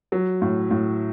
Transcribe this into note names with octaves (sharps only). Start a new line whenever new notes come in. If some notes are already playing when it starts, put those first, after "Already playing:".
F#3
A2
A2